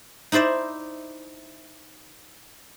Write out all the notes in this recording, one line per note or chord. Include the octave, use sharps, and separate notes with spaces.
D#4 E4 C5 D5 E5